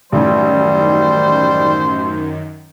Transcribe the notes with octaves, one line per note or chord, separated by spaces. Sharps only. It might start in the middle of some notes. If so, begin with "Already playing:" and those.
A1 F#2 D#3 G3 C5